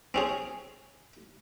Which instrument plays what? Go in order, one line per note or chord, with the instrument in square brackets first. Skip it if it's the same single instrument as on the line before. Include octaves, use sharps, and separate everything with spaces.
[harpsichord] C4 C#4 G#4